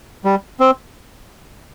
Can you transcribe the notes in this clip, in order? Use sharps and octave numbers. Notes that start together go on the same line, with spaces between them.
G3
C4